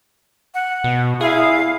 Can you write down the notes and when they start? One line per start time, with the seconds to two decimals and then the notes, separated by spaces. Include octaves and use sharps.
0.54 F#5
0.84 B2
1.21 E4 G#4 F5